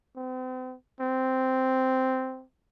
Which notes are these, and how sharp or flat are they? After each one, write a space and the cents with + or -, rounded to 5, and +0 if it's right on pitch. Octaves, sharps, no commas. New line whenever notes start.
C4 -40
C4 -5